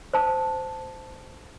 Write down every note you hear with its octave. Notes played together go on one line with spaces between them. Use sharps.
C5 A5